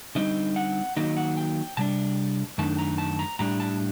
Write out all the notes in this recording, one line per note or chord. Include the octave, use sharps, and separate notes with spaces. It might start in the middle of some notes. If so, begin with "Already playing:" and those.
D3 G3 C4 D#4 D#5
F#5
D#3 F#3 A#3 D#4 D#5
F#5
G5
C3 G3 D4 A5
F#2 D#3 A3 D4 A5
A#5
A5
A#5
A2 G3 D4 A#5
A5